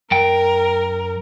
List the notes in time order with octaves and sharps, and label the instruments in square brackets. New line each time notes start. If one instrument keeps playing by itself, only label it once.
[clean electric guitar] F#2 G5 [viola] A#4